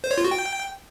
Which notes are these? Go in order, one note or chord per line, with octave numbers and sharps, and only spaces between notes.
C5
C#5
F4
F#4
G5